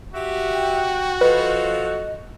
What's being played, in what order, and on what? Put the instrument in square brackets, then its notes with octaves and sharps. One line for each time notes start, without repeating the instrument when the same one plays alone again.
[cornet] F#4 [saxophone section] G4 E5
[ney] G5
[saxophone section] F3 A4 [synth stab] B4 [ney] D#5